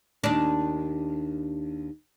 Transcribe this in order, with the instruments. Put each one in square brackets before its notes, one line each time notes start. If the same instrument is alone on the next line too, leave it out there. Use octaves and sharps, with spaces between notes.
[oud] D#2 D4